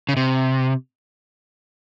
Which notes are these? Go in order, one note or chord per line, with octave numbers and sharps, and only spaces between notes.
C#3
C3